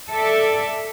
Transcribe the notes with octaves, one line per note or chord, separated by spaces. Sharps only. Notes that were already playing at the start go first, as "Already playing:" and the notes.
A4 D5 E5